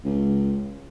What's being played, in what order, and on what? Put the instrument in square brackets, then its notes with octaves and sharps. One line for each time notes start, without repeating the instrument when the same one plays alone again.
[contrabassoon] C#2